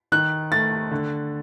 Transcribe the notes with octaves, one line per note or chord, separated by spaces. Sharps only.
D#3 F#6
A3 A6
D3